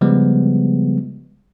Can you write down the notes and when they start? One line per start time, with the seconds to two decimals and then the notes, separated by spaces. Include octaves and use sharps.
0.01 C#3 F3 G3 G#3 B3